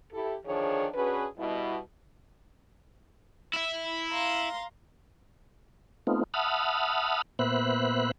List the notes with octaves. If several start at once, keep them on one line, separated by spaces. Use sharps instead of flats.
E4 G4 A4
D3 D#3 F3 D4 G#4 C#5
C#4 D4 F#4 G#4 B4
B2 G3 E4
E4 E5
F5 A#5 C6
A3 B3 C4 D#4 F4
E5 F#5 A5 B5 D#6 F6
A#2 B3 C5 E5 B5 F#6